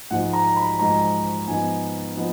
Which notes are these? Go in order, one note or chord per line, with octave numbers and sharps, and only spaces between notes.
G#2 F3 G#3 D#4 F#5
A#5
B5
G#2 F3 G#3 D#4 A#5
G#2 F3 B3 D#4 G#5
F3 B3 D#4